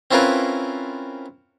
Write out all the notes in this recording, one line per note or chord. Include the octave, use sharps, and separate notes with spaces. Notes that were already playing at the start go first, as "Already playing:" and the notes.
C4 C#4 E4 F4 A#4 B4